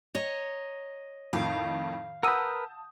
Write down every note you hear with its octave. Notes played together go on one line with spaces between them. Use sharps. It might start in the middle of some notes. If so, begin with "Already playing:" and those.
C#5 D#5 A#5
F2 A2 D#3 F5
A#4 B4 F#5 A5 D#6 E6 G6 D#7